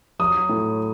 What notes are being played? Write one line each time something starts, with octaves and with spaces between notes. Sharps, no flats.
F#3 D#6
A2